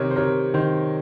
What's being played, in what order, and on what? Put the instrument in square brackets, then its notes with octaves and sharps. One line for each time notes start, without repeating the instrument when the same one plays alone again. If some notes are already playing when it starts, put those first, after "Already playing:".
Already playing: [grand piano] C3 D#3 [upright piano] A#4 C5 C#5
[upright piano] C5
[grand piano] C3 [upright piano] A#4 C#5
[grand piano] D#3 [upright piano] C5